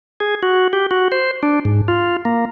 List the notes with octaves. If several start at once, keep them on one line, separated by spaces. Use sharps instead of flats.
G#4
F#4
G4
F#4
C5
D4
G#2
F4
A#3